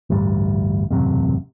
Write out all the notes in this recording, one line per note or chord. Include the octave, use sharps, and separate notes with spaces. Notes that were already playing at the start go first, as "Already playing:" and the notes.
A1 D2 G2 G3
E1 A1 F#2 C3